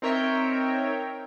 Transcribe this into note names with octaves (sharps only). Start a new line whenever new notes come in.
C4 D#4 A#4 C#5 E5 G5